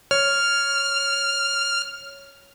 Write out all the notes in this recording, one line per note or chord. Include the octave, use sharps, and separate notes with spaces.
C#5 F6